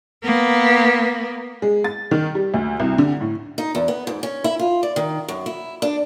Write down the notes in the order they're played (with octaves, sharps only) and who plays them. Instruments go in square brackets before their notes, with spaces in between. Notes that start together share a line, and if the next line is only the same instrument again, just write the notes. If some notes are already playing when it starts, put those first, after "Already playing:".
[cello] A#3 B3
[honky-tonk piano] G#3
A6
D#3
G3
D2
C2
D3
A2
[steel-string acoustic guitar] D#4
E2
B3
G#2
C#4
E4
F4
D5
D#3
F#2
E4
D4